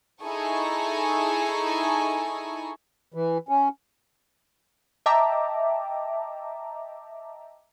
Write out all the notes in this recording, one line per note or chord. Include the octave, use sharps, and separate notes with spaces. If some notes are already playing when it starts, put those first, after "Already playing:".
D#4 E4 G#4 A4 G#5 C#6
E3
C#4
D#5 E5 G5 A5 A#5 D6